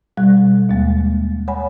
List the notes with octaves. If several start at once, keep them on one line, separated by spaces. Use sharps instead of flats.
B2 G3 F#6
D#2 G#3 A#3
C#5 F#5 G#5 B5